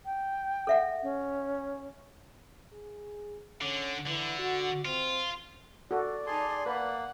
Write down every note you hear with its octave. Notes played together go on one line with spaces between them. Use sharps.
G5
A4 E5 F#5
C#4
G#4
D3 C#4
D3 E3
F#4
C4 F4
F#4 A4 D5
D#4 G#4 A5 C6
A#3 B4 F#5